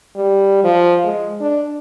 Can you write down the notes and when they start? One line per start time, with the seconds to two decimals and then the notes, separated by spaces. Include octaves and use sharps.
0.16 G3
0.64 F3
1.04 G#3
1.41 D4